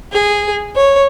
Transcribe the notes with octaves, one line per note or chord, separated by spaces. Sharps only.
G#4
C#5